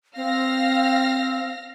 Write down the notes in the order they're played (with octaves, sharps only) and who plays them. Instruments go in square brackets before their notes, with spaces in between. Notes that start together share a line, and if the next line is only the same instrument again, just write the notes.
[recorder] C4 [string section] F5 F6 A#6